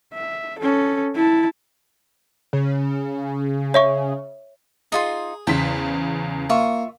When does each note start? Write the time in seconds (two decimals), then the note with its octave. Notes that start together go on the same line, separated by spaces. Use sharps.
0.13 E5
0.59 C#4 A4
1.15 E4 A5
2.53 C#3
3.74 C#5 E5 C#6
4.92 D#4 F4 G#4 C6
5.47 E2 C#3 C5 G5 B6
6.50 A#3 F4 E5 C#6